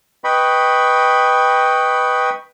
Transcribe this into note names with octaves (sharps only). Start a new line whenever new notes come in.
B4 D#5 G5 B5 C#6